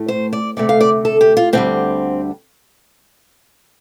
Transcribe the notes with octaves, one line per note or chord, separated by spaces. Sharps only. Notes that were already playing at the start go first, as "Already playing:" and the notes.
Already playing: A2 A3
C5
D5
D2 C3 A3 D5
F5
D5
A4
G4
F4
D2 D3 G3 C4